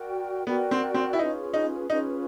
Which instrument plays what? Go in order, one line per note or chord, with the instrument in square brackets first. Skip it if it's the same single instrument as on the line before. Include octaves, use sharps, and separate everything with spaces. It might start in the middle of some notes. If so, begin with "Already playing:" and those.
Already playing: [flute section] F#4 A#4 D5 G5
[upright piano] B3 [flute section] F#4 A#4 D5 G5
[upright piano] C4
C4
E4
[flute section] C#4 F4 G#4 B4 [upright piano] D#4
[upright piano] D#4
[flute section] C#4 F4 G#4 B4 [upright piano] D#4